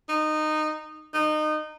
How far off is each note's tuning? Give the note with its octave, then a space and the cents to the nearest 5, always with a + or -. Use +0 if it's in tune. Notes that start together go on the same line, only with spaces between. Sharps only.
D#4 -15
D#4 -25